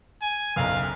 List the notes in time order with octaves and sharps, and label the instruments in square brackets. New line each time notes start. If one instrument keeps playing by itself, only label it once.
[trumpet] G#5
[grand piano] F#1 B1 [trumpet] F5